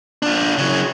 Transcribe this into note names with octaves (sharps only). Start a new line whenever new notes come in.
D4 F4
C#3 F#3